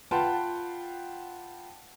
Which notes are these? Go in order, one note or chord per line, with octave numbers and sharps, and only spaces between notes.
F4 B4 F#5 G5 A5 C6